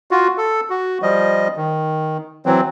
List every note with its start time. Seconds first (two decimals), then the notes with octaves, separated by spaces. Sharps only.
0.11 F4 F#4
0.38 A4
0.70 F#4
1.02 F3 G3 D#5
1.57 D#3
2.46 E3 F#3 C4